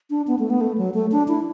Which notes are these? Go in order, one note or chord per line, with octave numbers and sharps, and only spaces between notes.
D4
B3
A3
B3
A3
F#3
A3
D4
E4